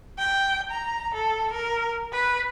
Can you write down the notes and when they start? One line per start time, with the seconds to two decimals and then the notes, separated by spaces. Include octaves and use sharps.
0.18 G5
0.71 A#5
1.14 A4
1.52 A#4
2.13 B4